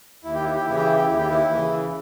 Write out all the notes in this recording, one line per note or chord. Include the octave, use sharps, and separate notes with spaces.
D#2 E4
G4
E4
G4
C#3 E3 E4
G4
E4
G4
D#2 E4
G4
E4
C#3 E3